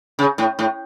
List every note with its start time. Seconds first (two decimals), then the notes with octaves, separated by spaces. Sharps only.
0.19 C#3
0.38 A2
0.59 A2